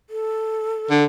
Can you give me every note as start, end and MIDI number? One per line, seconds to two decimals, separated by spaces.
0.10 1.05 69
0.90 1.05 50